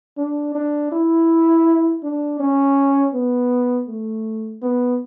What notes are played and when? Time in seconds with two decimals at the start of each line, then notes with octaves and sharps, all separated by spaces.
0.18 D4
0.55 D4
0.92 E4
2.03 D4
2.40 C#4
3.14 B3
3.88 A3
4.62 B3